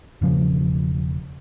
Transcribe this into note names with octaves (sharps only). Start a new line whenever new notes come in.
E1 C#3 F3